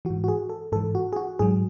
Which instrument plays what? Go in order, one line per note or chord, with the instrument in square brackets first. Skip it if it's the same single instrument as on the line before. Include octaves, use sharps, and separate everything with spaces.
[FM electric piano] E3 F#4
G#2
F#4
G#4
A4
G#2 A4
E3
F#4
G#4
F#4
G#2 F#3 G#4